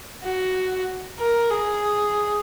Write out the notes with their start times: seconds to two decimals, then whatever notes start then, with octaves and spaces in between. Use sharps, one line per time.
0.24 F#4
1.19 A#4
1.50 G#4